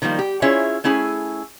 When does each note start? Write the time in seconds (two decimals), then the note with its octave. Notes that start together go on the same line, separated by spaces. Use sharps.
0.02 D#3 F3 G3 A#3
0.19 G4
0.42 C#4 E4 F4 G#4 C#5 E5
0.84 A3 C#4 E4 G#4 G#5